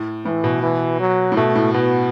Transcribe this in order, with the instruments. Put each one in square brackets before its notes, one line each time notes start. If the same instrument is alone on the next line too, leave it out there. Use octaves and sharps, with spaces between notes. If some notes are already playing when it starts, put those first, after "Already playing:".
Already playing: [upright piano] A2
[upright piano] A2 [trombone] E3
[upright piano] B2
[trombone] E3
F#3
[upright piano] A2
[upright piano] B2 [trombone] A3
[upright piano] A2
[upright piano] B2 [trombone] B3